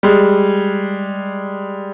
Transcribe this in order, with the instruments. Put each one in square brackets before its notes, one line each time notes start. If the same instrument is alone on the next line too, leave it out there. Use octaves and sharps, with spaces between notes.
[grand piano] G3 G#3